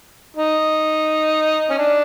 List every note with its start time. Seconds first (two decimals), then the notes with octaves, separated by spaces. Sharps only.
0.37 D#4
1.70 C#4
1.78 D4